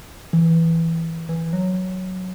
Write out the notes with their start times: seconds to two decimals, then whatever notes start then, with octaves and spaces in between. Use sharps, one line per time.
0.33 E3
1.29 E3
1.53 F#3